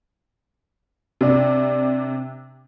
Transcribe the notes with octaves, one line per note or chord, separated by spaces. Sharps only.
C3 D4